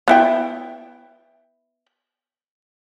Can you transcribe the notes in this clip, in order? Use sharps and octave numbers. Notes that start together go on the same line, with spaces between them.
B3 E4 G5